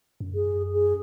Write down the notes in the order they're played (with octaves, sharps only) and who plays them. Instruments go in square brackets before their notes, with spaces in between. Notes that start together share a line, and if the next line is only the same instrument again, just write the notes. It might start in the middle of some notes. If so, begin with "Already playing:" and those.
[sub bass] F#2
[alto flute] G#4
G#4